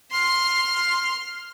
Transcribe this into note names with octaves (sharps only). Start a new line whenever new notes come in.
C6 F6